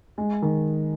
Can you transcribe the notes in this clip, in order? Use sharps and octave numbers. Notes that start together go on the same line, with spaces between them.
G#3
D#3